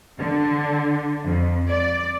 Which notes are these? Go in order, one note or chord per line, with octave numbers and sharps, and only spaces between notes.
D3
F2
D5